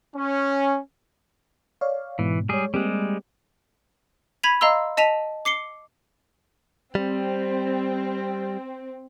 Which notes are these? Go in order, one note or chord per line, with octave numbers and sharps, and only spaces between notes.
C#4
C#5 D5 F5
G#2 B2 E3
G3 G#3 G#4 C#5
G3 G#3 A#3 C4 G4
B5 G#6 B6 D#7 F7
D#5 F5 A#5 C6 E6
D#5 A5 B6 D#7 F7
D6 C7 C#7 G7
G3 C4